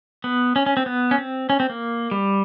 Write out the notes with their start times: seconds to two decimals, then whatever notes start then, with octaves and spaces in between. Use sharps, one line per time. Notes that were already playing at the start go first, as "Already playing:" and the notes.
0.24 B3
0.56 C#4
0.66 C#4
0.77 C4
0.86 B3
1.11 C#4
1.18 C4
1.50 C#4
1.60 C4
1.70 A#3
2.11 G3